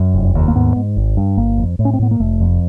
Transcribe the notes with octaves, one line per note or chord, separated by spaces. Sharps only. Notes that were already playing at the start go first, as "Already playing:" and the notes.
Already playing: F#2
F1
D#2
A#3
G#2 B3
G#2
G#1
G2
G1 A#3
F2
A2
C#4
C4
A2 B3
A#3
F1 A3
F2